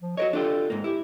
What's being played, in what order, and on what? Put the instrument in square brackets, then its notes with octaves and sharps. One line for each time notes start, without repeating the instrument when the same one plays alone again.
[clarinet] F3
[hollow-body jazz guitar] F#4 A#4 C#5 [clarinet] D#5
[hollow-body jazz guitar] D4 F4 G4 [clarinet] A4
[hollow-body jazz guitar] G#2 A#3
[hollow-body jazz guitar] E4 [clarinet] G4